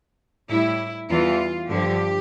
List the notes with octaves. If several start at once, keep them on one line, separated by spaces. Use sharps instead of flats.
A2 G3 E4
E2 E3 G3 F4
G2 D3 F3 G4